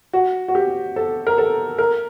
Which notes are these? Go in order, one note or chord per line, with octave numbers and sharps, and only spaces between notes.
F#4
F#4
G4
A4
A#4
A4
A#4